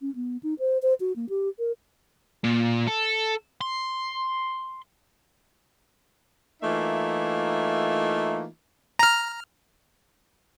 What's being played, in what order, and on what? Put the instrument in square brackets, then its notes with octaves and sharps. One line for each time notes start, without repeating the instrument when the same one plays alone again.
[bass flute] C#4
B3
D#4
C5
C5
F#4
A#3
G4
A#4
[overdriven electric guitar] A#2
A4
C6
[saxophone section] E3 A3 A#3 D#4 F4 E5
[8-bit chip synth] A#5 F6